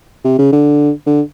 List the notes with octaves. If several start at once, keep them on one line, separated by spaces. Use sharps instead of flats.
C3
C#3
D3
D3